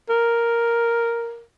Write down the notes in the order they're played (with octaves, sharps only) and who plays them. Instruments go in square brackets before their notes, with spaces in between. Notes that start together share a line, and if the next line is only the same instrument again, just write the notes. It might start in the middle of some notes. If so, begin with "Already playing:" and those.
[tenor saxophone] A#4